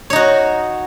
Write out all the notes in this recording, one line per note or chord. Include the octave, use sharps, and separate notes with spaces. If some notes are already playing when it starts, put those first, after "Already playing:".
D#4 F#4 C#5